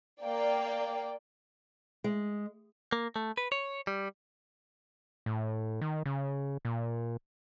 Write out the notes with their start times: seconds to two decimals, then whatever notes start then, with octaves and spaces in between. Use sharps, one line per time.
0.21 A#3 D5 G5
2.04 G#3
2.92 A#3
3.16 A3
3.38 B4
3.52 C#5
3.87 G3
5.26 A2
5.81 D#3
6.06 C#3
6.65 A#2